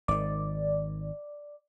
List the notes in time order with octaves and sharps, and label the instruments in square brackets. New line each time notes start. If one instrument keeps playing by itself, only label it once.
[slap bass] G#1 D#3 [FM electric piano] D5